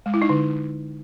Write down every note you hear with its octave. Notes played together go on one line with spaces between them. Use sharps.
G#3
E4
D#4
D3